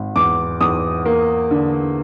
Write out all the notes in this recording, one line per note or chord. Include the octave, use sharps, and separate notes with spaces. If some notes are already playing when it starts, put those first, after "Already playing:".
Already playing: G#1
E2 D6
E2 D#6
A#3
D3